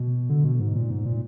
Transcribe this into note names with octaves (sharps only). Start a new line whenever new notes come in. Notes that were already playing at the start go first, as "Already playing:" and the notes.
Already playing: B2
D3
B2
G#2
A#2
G#2
A#2